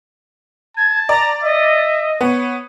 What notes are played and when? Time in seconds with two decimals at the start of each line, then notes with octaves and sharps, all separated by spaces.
0.77 A5 G#6
1.09 D5 A#5
1.43 D#5 E5
2.21 B3 C#5